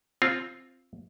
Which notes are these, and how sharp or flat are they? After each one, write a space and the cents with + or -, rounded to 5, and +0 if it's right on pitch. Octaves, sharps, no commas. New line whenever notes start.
C4 +5 F4 -5